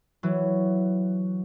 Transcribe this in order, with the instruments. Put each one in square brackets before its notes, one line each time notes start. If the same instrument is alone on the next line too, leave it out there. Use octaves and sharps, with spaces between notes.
[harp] E3 F#3